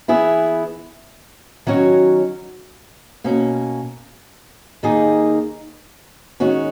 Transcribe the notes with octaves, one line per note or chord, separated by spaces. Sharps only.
E3 B3 E4 G#4
D#3 F#3 C#4 F#4 C#5
B2 A#3 C#4
D#2 D#3 A#3 D#4 G#4
D#3 G#3 C#4 F#4 C#5